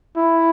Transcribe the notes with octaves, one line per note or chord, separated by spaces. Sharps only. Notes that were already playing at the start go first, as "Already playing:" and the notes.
E4